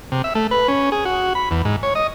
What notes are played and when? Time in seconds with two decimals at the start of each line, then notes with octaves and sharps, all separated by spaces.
0.12 C3
0.24 E5
0.35 A3
0.51 B4
0.68 C#4
0.92 G#4
1.05 F#4
1.35 B5
1.51 E2
1.65 G#2
1.83 C#5
1.95 D#5